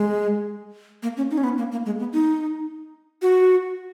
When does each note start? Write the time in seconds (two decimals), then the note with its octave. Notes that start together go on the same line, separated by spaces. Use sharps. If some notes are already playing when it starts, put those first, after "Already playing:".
Already playing: G#3
1.03 A#3
1.17 C#4
1.31 D#4
1.38 C#4
1.44 B3
1.58 A#3
1.71 A#3
1.86 G#3
1.99 B3
2.13 D#4
3.22 F#4